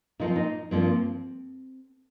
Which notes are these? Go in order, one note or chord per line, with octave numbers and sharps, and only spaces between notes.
A#2 F3 A#3 D#4
C4
D#4
G2 F3 A#3 C4